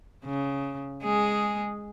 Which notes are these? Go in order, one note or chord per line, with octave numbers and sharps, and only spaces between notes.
C#3
G#3 G#4